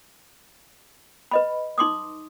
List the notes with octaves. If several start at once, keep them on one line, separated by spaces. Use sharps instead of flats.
B4 D#5 B5
D#4 C6 D6 D#6